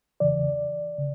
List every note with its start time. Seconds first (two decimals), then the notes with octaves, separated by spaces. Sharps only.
0.20 E2 C#3 E3 D5
0.98 C#3